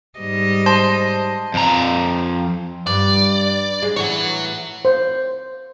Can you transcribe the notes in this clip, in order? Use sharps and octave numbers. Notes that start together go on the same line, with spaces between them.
G#2 G3 D#5
C5 A5 C6
F2 A#5
G2 D5
G#3
A2 E3 C#5 F#5
C5